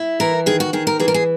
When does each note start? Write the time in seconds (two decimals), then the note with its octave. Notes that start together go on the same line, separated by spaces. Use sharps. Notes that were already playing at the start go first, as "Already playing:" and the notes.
Already playing: E4
0.20 E3 A#4
0.46 D#3 G#4
0.60 F#4
0.73 D#3 G#4
0.87 A#4
1.00 E3 G#4
1.08 A#4
1.14 G#4